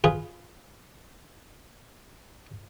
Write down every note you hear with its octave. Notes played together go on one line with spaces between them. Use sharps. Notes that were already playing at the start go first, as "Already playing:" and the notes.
F4 G#4 B4